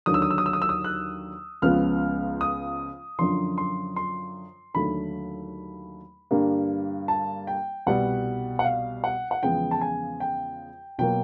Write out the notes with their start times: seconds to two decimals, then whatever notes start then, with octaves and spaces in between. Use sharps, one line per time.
0.06 D#2 D3 F#3 D#6
0.14 E6
0.22 D#6
0.30 E6
0.38 D#6
0.46 E6
0.53 D#6
0.62 E6
0.69 D#6
0.84 F#6
1.62 C#2 C#3 F3 G#3 B3 F6
2.41 D#6
3.19 F#2 D3 F3 C6
3.58 C6
3.96 C6
4.74 D#2 D3 F#3 A3 B5
6.31 G2 D3 G3 A#3
7.08 A5
7.47 G5
7.87 C2 B2 G3 B3 F#5
8.59 F#5
8.64 F5
9.04 F#5
9.31 F#5
9.43 E2 C#3 F3 G#3 B3 G5
9.71 A5
9.81 G#5
10.20 G5
10.99 B2 F#3 A#3 G5